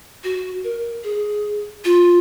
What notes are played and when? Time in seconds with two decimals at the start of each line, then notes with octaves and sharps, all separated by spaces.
0.24 F#4
0.64 A#4
1.04 G#4
1.85 F4